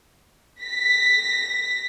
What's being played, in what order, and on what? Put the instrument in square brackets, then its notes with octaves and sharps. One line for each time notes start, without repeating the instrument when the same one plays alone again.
[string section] A#6 B6